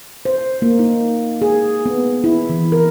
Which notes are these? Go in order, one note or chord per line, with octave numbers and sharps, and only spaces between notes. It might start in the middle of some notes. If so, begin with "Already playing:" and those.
C5
A#3
D#4
G#4
B3
E4
E3
A#4